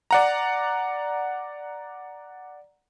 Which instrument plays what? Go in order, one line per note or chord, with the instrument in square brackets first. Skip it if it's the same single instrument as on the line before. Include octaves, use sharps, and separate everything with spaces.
[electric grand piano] D5 F#5 A#5